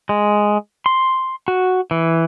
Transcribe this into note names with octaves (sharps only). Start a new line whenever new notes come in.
G#3
C6
F#4
E3